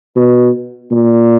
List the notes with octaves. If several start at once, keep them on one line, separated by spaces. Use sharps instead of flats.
B2
A#2